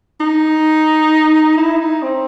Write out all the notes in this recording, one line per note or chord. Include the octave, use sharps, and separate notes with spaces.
D#4
E4
D#4
C4